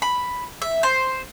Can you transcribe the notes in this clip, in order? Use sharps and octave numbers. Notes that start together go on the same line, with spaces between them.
B5
E5
C5